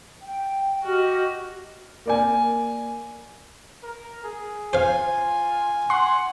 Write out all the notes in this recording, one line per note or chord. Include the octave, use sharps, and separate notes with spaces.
G5
F#4 G4 D#5 F6
A#3 D5 G#5
A#4
G#4
F4 C5 F5 G#5
F#5 C6